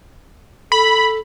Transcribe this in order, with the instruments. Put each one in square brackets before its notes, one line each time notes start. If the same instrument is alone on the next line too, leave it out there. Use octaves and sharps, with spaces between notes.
[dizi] A4 [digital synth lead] B5